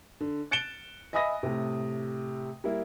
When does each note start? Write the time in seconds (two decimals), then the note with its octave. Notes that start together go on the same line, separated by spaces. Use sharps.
0.20 D3
0.51 F#6 A6 C#7 D7 E7 G7
1.13 D#5 E5 G#5 B5 D#6 A#6
1.43 A2 C3
2.64 G3 A#3 E4